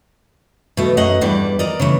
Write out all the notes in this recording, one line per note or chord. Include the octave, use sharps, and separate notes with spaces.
B2 A3
F#2 A3 D#5 F#5
E2 G2 E3 G3
A#4 D5 D#5
C#3 E3 A3